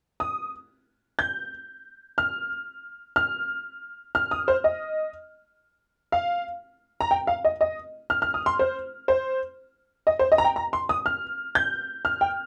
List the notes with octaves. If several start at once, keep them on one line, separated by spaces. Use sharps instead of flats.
D#6
G6
F6
F6
F6
D#6
C5
D#5
F5
A#5
G5
F5
D#5
D#5
F6
F6
D#6
C6
C5
C5
D#5
C5
D#5
A#5
G5
A#5
C6
D#6
F6
G6
F6
G5